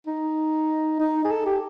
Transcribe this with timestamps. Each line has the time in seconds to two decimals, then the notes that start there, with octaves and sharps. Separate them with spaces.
0.07 D#4
1.00 D#4
1.24 G#4
1.31 A4
1.46 G4